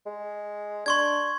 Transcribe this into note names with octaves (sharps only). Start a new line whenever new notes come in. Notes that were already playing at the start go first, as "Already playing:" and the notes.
G#3
D4 C6 C#6 G#6